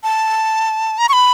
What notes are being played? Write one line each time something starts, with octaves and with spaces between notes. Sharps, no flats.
A5
A#5
C#6
B5